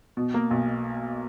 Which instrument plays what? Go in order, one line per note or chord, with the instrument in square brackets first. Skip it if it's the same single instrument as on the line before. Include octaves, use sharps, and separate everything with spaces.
[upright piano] B2
A#3
B1